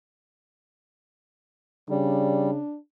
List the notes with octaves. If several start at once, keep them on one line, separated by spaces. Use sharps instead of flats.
C#3 G3 D4